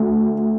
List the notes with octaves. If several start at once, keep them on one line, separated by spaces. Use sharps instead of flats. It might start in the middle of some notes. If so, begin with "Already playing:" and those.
Already playing: D2